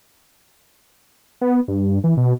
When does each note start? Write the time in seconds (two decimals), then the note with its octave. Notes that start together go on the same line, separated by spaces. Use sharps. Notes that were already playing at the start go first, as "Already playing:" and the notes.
1.41 B3
1.68 G2
2.04 E3
2.17 B2